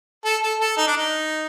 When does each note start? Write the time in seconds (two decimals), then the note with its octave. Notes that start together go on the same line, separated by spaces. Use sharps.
0.25 A4
0.42 A4
0.60 A4
0.77 D#4
0.87 D4
0.97 D#4